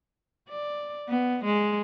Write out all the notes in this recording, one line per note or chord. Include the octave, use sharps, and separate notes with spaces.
D5
B3
G#3